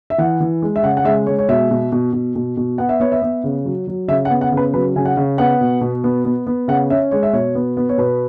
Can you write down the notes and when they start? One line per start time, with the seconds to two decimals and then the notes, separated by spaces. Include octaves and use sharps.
0.10 E5
0.18 E3 F#5
0.40 E3
0.62 G#3
0.76 E5
0.83 C#3 F#5
0.97 F#5
1.05 G#3 E5
1.26 G#3 C#5
1.39 C#5
1.49 B2 E5
1.71 B2
1.92 B2
2.13 B2
2.35 B2
2.57 B2
2.78 B3 F#5
2.89 E5
3.00 B3 C#5
3.12 E5
3.22 B3
3.44 C#3
3.65 F#3
3.87 F#3
4.08 C#3 E5
4.25 F#5
4.30 B3
4.41 F#5
4.52 C#3
4.57 B4
4.74 F#3 B4
4.96 C#3 G#5
5.05 F#5
5.17 C#3
5.38 B3 F#5
5.61 B2
5.81 B2
6.04 B3
6.25 B3
6.47 B3
6.68 C#3 F#5
6.90 C#4 E5
7.11 G#3 C#5
7.23 E5
7.33 B2 C#5
7.55 B3
7.77 B3
7.89 C#5
7.98 B2 B4